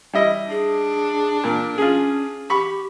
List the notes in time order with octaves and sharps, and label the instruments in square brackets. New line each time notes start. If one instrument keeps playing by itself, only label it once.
[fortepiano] G3 E4 D#5
[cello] D4 [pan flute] G#4
[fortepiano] A#2 [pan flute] A#4
[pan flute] C#4 [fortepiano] F4 G#4
[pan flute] G4 [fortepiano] B5 C#6